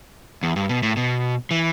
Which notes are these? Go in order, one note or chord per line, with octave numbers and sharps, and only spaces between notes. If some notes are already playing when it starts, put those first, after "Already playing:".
E2
G2
B2
A2
B2
E3